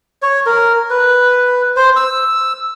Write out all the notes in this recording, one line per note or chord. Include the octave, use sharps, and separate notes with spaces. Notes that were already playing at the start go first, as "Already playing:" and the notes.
C#5
A#4
B4
C5
E6